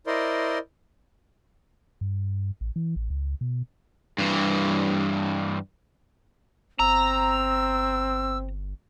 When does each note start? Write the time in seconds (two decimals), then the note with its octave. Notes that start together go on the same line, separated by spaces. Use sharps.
0.07 E4 A#4 C5 D5 D#5 C6
2.01 G2
2.61 A1
2.76 E3
2.96 A1
3.10 C#2
3.41 B2
4.18 G2 E3
6.79 G1 C4 A#5 E6